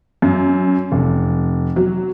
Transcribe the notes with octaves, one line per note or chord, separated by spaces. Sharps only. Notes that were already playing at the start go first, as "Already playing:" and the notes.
F#2
F1
F#3